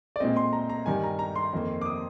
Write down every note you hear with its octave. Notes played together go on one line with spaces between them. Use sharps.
D5
A#2 G#3 C4 D#5
C6
A#5
A#5
G2 D#3 G3 G#5
A#5
A#5
C6
F2 D#3 A#3
D6
D#6